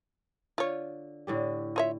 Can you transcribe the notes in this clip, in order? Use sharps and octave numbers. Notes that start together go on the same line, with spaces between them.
D3 F4 C#5
A2 D3 G4
F4 C#5 E5